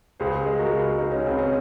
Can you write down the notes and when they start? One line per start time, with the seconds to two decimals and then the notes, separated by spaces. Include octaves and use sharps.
0.20 C#2 G#4 C5
0.46 G#3
0.59 F#4 A#4
0.72 C#2
0.98 G#3 D#4
1.12 C#4
1.24 C#2 C4
1.39 C#4